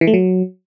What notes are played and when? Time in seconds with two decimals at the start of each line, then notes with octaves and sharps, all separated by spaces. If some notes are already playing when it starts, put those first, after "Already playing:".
0.01 E3
0.07 A3
0.14 F#3